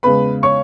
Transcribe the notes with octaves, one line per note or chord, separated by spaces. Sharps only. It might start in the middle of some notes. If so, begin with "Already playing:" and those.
E2 C#3 G#3 B4 B5
C#5 C#6